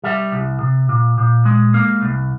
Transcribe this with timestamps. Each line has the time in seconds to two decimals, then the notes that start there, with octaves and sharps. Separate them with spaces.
0.04 G3 E5
0.32 C2
0.60 C3
0.89 A#2
1.18 A#2
1.45 G#3
1.74 A#3
2.02 C2